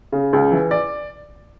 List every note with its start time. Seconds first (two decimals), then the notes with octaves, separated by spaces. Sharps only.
0.12 C#3
0.33 C#2
0.52 E3
0.71 D5